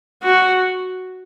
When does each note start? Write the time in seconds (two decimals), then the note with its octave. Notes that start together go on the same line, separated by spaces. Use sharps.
0.23 F#4